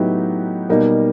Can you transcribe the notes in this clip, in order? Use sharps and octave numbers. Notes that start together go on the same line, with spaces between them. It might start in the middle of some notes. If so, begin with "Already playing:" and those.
Already playing: A2 F#3 B3 D#4 G4
B2 G3 A#3 D#4